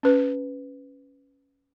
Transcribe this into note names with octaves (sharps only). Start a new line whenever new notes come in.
C#4 B4